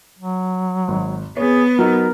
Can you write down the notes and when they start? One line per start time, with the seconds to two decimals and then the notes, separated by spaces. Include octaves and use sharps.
0.19 F#3
0.88 G#1
1.37 B3 G#4 C#5
1.79 F#3 D#4 A#4